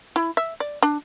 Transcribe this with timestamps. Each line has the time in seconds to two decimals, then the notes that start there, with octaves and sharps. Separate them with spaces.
0.16 E4
0.37 E5
0.60 D5
0.83 D4